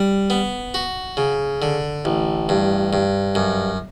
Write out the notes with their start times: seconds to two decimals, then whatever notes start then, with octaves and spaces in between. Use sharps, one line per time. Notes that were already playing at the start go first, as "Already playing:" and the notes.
Already playing: G3
0.30 B3
0.74 F#4
1.17 C#3
1.62 D3
2.05 A1
2.49 G2
2.93 G2
3.35 F#2